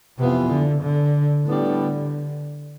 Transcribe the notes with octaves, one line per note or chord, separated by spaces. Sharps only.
F2 C3 E3 B3 F4
D3
D3
A2 D3 G3 B3 D4